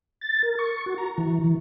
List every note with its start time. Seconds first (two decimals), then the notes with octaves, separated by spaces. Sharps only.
0.21 A6
0.43 A#4
0.59 C#6
0.86 F#4
0.98 A#5
1.18 E3
1.44 E3